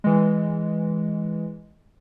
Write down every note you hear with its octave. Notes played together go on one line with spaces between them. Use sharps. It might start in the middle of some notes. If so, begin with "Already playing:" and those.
E3 G#3